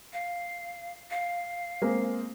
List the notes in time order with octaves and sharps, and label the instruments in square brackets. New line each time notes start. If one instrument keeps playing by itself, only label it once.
[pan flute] F5
F5
[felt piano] G#3 A#3 C4